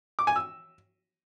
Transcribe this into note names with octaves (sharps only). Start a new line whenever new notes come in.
D6
G#5
E6